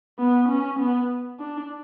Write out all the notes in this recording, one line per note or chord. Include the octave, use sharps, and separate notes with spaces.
B3
C#4
B3
D4